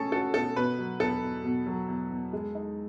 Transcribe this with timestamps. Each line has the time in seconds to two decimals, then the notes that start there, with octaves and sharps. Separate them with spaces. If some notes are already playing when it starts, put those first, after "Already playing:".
Already playing: B2 A3 C#4 G#4 A4
0.12 F#4 A4
0.34 B2 A4
0.56 B2 B4
0.78 F#3
1.00 E2 A4
1.22 E2
1.44 B2
1.67 F#3
1.88 E2
2.10 E2
2.33 G#3
2.55 D#4